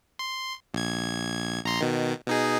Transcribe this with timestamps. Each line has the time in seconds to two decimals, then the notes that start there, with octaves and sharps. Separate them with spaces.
0.19 C6
0.74 A#1 G#6
1.64 A#1 A#5 C6
1.81 B2 D#3
2.27 B2 D#4 G#4